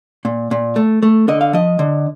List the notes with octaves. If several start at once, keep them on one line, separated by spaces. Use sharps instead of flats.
A#2
A#2
A3
A3
D3 D#5
F5
F3 D#5
D3